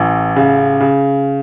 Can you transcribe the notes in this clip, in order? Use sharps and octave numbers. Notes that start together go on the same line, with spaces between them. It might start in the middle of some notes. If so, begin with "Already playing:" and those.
Already playing: A1 E3
C#3
C#3